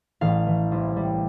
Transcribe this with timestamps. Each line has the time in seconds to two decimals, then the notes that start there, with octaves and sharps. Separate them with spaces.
0.21 A1 F5
0.47 E3
0.72 C2
0.96 G3